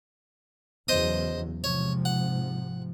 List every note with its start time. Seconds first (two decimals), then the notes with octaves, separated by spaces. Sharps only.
0.88 E2 C#3 F#3 C5 D#5 D#6
1.64 G#2 C3 F3 C#5
2.05 F#5